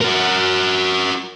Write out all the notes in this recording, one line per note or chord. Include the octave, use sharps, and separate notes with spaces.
F#4 A#4